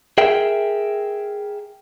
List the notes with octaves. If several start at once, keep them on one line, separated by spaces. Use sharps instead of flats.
G#4 A#4 E5 G5